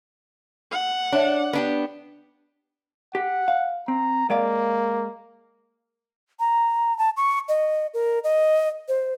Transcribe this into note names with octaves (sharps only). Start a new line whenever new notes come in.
F#5
D4 C#5 E5 A5
B3 D4 G4
G4 F#5
F5
C4 A#5
G#3 A#3 D5 F5
A#5
A5
C#6
D#5
A#4
D#5
C5